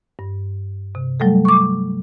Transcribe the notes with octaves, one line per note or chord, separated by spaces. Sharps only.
G2
C3
F#3 G3 A3 A4
C#6 D6